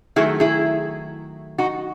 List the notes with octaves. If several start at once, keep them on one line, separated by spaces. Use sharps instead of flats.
D#3 F#3 A3 E4 G#4
E4 G#4
D#4 F#4